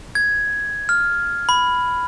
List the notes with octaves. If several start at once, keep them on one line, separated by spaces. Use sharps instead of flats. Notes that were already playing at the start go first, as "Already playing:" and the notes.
G#6
F6
B5